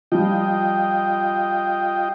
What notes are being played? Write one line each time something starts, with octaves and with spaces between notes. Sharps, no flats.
F3 G3 F4 D#5 G5